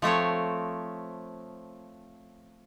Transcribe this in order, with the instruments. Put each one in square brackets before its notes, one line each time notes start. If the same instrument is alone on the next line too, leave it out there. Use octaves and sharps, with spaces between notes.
[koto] F3 A3 C4 C#5